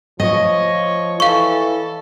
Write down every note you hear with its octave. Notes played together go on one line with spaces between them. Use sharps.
F3 C#5 D#5
E3 A4 F5 C#6